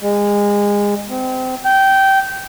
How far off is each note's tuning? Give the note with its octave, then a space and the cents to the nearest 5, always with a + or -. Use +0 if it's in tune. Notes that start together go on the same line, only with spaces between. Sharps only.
G#3 -25
C4 -25
G5 -15